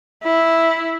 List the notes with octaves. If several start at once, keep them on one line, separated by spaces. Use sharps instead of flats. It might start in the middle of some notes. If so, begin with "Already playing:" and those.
E4